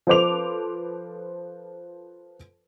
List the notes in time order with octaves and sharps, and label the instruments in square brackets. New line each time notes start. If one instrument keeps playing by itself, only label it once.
[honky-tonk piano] F3 A4 B4 C5 D6 F7